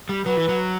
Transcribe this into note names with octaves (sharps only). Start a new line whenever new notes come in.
G3
F#3 B4
E3
F#3